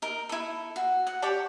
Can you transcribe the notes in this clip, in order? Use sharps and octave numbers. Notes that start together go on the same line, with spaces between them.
D#4 A#4
E4 A4
F#4
F#5
G4 C#5 D5 A5